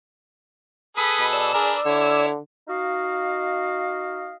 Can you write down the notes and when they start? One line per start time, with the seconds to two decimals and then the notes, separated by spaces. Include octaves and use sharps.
0.97 G#4 A4 B4 B5 D#6
1.20 B2
1.33 D5 E6
1.54 D4 G#4 A#4 B4
1.85 D3 E4 C#5
2.68 D#4 F#4 D#5 F5